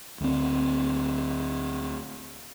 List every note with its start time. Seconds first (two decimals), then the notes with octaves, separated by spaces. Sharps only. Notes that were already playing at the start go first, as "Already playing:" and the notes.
0.20 D2 C4